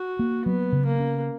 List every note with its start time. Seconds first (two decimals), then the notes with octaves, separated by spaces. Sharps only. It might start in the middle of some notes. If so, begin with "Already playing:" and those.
Already playing: F#4
0.19 A#3
0.45 F#3 B3
0.72 C#3
0.86 A#3
0.99 C#4